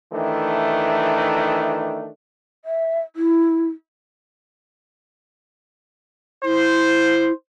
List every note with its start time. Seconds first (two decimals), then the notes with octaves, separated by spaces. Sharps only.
0.12 D#3 E3 A3 D4
2.65 E5
3.16 E4
6.44 E4 C5